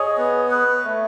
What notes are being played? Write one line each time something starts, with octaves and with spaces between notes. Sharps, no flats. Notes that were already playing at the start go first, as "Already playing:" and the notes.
Already playing: G#4 C#5 D#5
B3
B4
A3